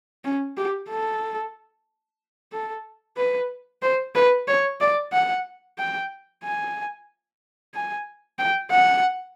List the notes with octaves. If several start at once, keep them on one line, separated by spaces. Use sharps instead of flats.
C#4
G4
A4
A4
B4
C5
B4
C#5
D5
F#5
G5
G#5
G#5
G5
F#5